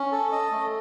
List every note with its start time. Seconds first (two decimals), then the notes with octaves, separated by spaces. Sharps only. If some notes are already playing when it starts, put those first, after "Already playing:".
Already playing: C#4
0.12 A4
0.32 D#5
0.52 A3